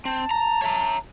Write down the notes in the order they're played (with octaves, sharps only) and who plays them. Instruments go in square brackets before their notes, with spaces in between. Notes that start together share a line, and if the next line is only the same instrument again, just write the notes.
[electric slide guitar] C4 [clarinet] A5
[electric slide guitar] A#5
C#5 E5 A#5